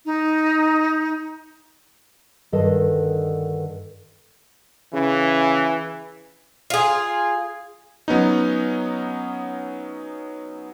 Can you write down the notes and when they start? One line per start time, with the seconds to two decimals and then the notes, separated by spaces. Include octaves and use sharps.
0.05 D#4
2.52 G2 D3 D#3 A4 D#5
4.93 C#3 E3
6.70 F4 G#4
8.08 F#3 B3 C#4 D#4